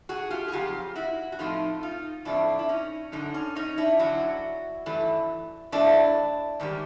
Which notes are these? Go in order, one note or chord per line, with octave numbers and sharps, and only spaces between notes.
F#4 G#4
F4 G4
G#4
F2 C#3 F#3 F4 G4
E4 F#4
F#4
A2 F3 A3 C4 D#4 F4
D#4 F4
A2 F3 A3 C4 D4 E4
E4
C#4 D#4
F#2 D3 F#3 D#4
C#4
C#4 D#4
D4 E4
F#2 D3 F#3 E4 F#4
G2 E3 A3
G2 E3 A3 D4 E4
G#2 D#3 G3